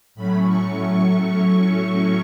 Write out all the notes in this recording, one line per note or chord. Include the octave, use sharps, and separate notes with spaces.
A2 F#3 A3 C#4 B5
C#6